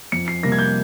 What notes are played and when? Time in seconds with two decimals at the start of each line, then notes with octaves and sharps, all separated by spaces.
0.12 F2 C#7
0.28 C7
0.43 C3 G3 A#3 A#6
0.52 G#6
0.59 G6